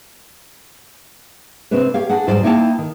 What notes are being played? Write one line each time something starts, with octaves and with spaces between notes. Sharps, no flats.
C3 C4 D4 B4 C#5
G4 C#5 F5
D4 G#4 F#5
E2 G#2 F#3 G3 C5 D5
A#3 D#4 E4 C#5 G5 A5
D#3